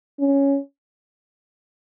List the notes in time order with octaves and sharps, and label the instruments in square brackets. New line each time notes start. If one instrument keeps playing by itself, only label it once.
[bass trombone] C#4